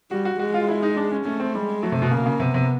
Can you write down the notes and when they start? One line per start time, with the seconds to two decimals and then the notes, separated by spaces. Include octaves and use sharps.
0.11 G3 F#4
0.25 F#4
0.39 G#3 F#4
0.54 F4
0.68 E4
0.82 D#4
0.97 D4
1.11 C#4
1.25 A3 C#4
1.40 C4
1.54 G3 G#3
1.82 F#3 A3
1.92 C3
2.02 B2
2.11 C#3 A#3
2.26 C#3
2.40 C3 B3
2.54 C3